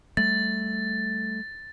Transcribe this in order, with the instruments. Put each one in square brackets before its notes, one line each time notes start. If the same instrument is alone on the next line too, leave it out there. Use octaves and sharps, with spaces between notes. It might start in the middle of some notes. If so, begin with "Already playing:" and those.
[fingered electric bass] G3 A3 [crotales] A6